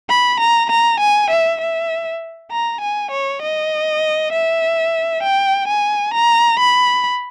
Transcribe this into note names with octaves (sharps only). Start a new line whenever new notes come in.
B5
A#5
A#5
G#5
E5
E5
A#5
G#5
C#5
D#5
E5
G5
G#5
A#5
B5